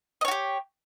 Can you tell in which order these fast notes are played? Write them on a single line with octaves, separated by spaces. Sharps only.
D#5 C#5 F#4 G4